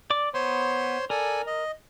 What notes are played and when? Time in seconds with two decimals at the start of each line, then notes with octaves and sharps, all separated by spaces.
0.10 D5 D6
0.34 B3 C5 C#5 C6
1.10 A4 A#4 D5 G#5
1.47 D#5